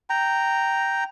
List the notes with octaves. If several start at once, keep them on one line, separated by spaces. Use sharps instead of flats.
G5 A#5